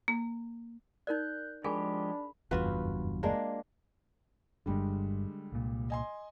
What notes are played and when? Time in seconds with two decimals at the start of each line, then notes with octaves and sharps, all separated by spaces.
0.08 A#3
1.07 D#4 A#4 D5 F#6 G6
1.64 F3 G#3 D4 G4 G#4 A#4 G#5 B5
2.51 F#1 E2 G2 F4 F#4 B4
3.23 G#3 A#3 D4
4.66 G1 G2 D3 G3 G#3
5.52 C2 A#2
5.90 D#5 G#5 C6